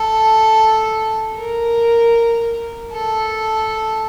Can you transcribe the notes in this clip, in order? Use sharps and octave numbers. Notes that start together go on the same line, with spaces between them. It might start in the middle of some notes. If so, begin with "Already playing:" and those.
Already playing: A4
A#4
A4